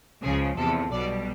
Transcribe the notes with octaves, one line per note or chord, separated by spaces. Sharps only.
C#2 C#3 F3 G#4
E2 C3 F3 A4
B1 B2 G3 D5